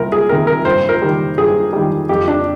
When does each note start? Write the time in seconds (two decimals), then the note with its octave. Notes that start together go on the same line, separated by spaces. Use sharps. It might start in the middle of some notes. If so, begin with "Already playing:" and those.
Already playing: C2 A#4
0.12 G#4
0.29 C3 D#3 A#4
0.47 A#4
0.65 G2 C5
0.89 A#4
1.02 D#3 G3
1.38 G2 G#4
1.73 D#3 G3
2.09 F2 G4
2.28 D4